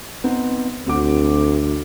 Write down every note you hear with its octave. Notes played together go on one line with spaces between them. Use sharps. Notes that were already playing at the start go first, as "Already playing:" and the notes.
B3 C4 D#4
D2 C4 F#4 D6